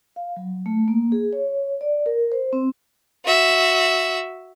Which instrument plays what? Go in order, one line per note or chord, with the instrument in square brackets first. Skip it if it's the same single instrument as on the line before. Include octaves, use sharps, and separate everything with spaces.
[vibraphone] F5
F#3
A3
A#3
G#4
C#5
D5
A#4
C5
C4
[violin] F#4 E5